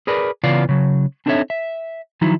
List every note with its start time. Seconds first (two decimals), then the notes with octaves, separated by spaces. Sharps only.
0.07 G#4 A#4 B4 D5
0.43 C#3 E3 B3 F4 D5 F5
0.69 C#3 F#3
1.26 C4 D4 D#4 A4 C#5 E5
1.50 E5
2.21 D#3 F3 F#3 D#4 E4